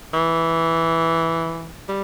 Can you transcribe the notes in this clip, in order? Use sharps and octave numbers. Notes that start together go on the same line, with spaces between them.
E3
G3